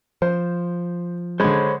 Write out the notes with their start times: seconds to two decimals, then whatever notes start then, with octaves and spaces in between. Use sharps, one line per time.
0.22 F3 C5
1.40 D3 G#3 C5 C#5 B5